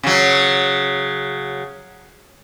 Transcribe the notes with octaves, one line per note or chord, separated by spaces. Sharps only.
C#3 F#3